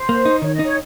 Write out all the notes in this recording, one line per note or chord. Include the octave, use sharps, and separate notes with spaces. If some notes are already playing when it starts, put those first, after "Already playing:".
Already playing: C5
A#3
D#4
D#3 C#5
D#5
D#4
C#5